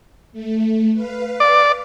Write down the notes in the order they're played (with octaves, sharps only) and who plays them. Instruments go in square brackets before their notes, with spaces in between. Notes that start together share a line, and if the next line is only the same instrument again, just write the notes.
[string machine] A3
B4 F5
[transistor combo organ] D5